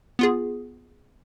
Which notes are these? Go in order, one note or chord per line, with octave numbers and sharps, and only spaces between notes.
B3 F4 G#4